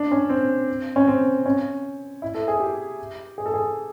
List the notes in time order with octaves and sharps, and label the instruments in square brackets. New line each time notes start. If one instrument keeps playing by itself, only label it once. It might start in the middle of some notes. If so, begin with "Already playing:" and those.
Already playing: [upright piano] D4
C#4
C4
C#4
C4
C#4
E4
A4
G#4
G4
G#4
A4
G#4